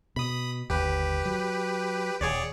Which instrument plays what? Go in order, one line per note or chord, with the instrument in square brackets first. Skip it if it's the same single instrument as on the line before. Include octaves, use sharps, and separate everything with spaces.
[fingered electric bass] B2 [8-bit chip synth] B5 D#6
[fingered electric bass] G1 D#2 [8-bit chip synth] G4 B4
[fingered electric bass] F#3
[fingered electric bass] D#1 D#2 [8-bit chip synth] G#4 C#5 D5